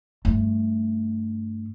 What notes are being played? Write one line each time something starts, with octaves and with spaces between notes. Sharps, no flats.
G2 A3